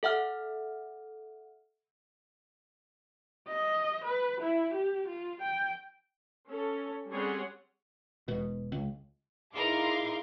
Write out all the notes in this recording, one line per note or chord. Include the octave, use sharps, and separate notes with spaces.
A4 E5 F#5 F6
D#5
B4
E4
G4
F4
G5
C#4 A4
G3 C4 C#4 G#4 C#5 F#5
E1 B2
C#2
D#4 E4 G#4 A#4 F5 C6 D6